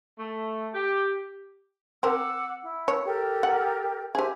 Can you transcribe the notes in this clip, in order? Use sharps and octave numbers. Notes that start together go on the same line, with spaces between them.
A3
G4
C4 A#4 F#5 D6 E6
E4
C#5
G4 A4 A#4
F#5
G4 G#4 C5 E5 G#5